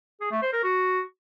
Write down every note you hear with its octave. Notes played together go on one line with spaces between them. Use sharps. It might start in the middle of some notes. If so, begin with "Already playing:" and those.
G#4
A3
C5
A#4
F#4